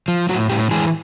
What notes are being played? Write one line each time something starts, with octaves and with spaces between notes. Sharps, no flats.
F3
A2 F#3 F#4
A2 G3 G4
E3 G#3 G#4